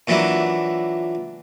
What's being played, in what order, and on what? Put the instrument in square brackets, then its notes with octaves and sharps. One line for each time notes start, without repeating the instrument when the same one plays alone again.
[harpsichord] A#2 E3 F#3 D4 E4